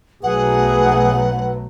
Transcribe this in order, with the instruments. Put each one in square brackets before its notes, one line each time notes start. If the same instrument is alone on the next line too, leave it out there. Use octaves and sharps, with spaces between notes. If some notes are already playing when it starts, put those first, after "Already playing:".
[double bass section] B1 F#3 A3 [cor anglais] G#4 [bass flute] B4 [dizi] F#5